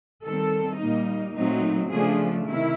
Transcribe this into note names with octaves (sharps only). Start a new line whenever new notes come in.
D#3 G3 C4 A4
A#2 G3 A#3 D#4
A#2 F#3 A3 C4 D#4
C#3 F3 A3 D4 G#4
C3 D#3 E4